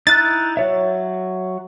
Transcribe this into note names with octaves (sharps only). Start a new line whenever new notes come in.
D#4 E4 F#6 A6
F#3 C#5 E5